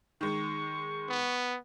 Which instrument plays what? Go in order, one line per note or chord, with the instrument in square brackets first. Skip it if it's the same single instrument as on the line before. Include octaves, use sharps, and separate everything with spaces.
[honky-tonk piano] D#3 G#3 [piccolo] C#6
[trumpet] B3